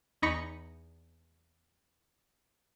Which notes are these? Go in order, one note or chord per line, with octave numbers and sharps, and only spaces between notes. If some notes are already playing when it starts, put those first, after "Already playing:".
E2 D#4 B5 C#6 A#6 C#7